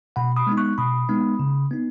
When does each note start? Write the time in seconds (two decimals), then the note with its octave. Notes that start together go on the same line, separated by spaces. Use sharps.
0.16 B2 F#5 B5
0.36 B5 D#6
0.47 G#3 B3 D#4
0.57 C#6 F#6
0.78 B2 B5 D#6
1.09 G#3 B3 D#4
1.39 C#3
1.71 B3 D#4